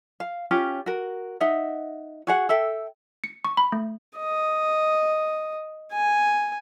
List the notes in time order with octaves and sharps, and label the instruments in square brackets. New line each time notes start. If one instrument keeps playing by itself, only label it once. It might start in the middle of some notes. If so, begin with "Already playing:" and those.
[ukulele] F5
C#4 F4 G4
F#4 A#4
D#4 D#5 E5 F#5
F#4 G#4 F#5
A4 E5 G5
[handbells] C#7
C#6
B5
A3
[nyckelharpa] D#5
G#5